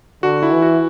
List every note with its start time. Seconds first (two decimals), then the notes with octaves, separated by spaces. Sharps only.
0.23 D3 F#4
0.43 E4
0.52 E3
0.62 F#4